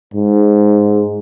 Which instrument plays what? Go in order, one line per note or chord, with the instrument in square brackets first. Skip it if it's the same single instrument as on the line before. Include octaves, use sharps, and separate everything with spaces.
[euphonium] G#2